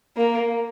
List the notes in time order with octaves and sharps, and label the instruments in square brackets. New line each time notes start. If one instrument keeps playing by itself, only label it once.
[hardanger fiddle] A#3